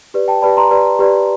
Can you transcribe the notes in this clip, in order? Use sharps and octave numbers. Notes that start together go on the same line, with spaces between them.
G4 B4 D5
G5 A5
G4 B4 D5 A5 B5
A#5 C6
G4 B4 D5
G4 B4 D5